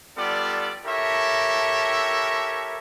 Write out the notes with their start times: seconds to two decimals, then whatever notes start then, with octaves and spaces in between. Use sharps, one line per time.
0.17 G3 B3 F4 A4 D5
0.86 E4 G4 A4 A#4 C#5 E5